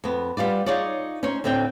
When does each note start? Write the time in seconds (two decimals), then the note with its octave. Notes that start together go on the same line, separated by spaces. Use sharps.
0.04 F2 B3
0.37 G3 B3 F4 D5
0.66 D#4 F4 G#4 C#5 D5
1.23 C#4 D#4 C5 C#5
1.44 D2 A2 C4 D4 G5